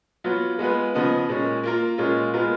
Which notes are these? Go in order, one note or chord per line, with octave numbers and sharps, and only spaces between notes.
F#3 B3 F4
G#3 B3 F4 B4
C#3 F3 B3 D#4
A#2 G#3 C#4
A#3 F4 A#4
A#2 G#3 C#4 F4
G#3 B3 F4 A#4